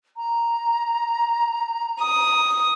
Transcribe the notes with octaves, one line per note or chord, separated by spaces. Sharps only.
A#5
D#6